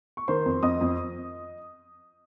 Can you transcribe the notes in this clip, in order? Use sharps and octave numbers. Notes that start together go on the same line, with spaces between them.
C#6
D#3 C5 C6
F2
F2 D#5 D#6
F2